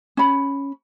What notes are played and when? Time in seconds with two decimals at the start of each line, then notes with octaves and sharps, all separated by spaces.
0.17 C#4 B5